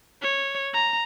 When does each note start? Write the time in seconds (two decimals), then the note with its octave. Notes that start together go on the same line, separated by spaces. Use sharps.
0.22 C#5
0.73 A#5